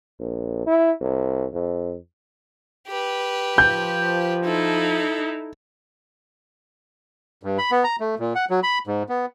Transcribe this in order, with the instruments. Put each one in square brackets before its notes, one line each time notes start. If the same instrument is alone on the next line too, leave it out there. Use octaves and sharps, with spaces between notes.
[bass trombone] A#1
E4
C2
F2
[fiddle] G4 B4
[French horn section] F3 [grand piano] G6
[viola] D#4 E4 [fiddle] A4
[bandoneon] G2
B5
B3
A#5
A3
A#2
F#5
F#3
B5
G#2
B3